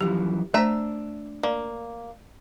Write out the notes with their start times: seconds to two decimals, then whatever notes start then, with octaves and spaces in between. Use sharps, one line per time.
0.01 F#2 E3 F3 G4
0.54 A3 D4 C5 E5 A#5
1.43 A#3 D5